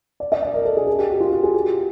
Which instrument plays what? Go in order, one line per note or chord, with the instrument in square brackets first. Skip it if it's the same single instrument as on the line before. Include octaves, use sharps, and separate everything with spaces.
[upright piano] D5
D#5
D5
A#4
A4
G#4
G#4
G4
F#4
F4
G4
F#4
G#4
G4